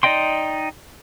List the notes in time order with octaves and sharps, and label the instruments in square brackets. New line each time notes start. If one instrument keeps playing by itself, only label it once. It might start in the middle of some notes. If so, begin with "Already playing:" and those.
[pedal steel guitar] D#4 D5 D#5 G5 C6